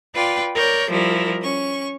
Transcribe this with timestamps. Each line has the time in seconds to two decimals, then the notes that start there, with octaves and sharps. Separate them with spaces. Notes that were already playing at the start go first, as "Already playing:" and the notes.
0.14 F4 B4 D5 G5
0.54 A#4 C#5 D5 G6
0.90 F3 G3 E4 A#4
1.41 C#4 C#6